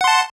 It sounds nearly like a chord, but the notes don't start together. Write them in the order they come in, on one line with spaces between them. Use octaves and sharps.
F#5 C6 A5